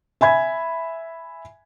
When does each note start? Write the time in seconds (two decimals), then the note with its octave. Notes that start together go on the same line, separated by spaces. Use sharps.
0.21 E5 G#5 B5 G#6